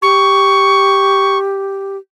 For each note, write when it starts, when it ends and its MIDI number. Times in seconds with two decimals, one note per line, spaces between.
0.02 1.97 67
0.02 1.38 85